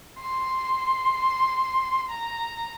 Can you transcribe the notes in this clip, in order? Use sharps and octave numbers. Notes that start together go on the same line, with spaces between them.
C6
A#5